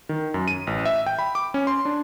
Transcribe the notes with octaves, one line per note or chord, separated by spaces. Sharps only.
D#3
F#2
D#7
A1
E5
G5
B5
D6
C#4
C6
D4